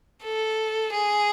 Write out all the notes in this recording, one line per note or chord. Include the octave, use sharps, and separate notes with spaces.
A4
G#4